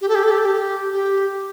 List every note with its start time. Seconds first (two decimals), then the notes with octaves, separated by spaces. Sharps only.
0.01 G4
0.09 A4
0.15 G4
0.23 A4
0.31 G4
0.38 A4
0.45 G4
0.93 G4